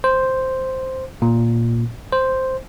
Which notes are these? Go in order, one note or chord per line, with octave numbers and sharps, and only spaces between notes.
C5
A#2
C5